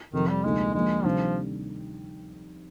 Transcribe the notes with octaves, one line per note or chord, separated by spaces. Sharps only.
F2 C3 D#3 F3
G3
D2 C3 F3 G#3 A#3 D#4
D3 F3 G#3 A#3
C3 D#3 F3 G3 D4